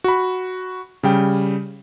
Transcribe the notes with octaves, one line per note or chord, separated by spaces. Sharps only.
F#4 B5
C#3 G3 G5